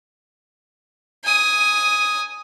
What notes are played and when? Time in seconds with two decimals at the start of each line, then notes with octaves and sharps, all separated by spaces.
1.24 G#5 D#6